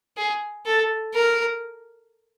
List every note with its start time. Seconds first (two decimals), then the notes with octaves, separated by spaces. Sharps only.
0.17 G#4
0.66 A4
1.14 A#4